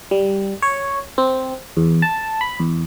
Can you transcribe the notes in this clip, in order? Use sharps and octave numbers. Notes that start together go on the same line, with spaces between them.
G3
C#5
C4
E2
A5
B5
E2